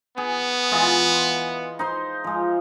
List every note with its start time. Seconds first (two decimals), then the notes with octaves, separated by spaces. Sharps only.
0.18 B3 G#4
0.71 E3 G#3 F4
1.79 D#4 C5 C6
2.24 F3 G#3